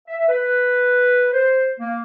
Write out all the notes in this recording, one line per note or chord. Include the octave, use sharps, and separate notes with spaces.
E5
B4
C5
A#3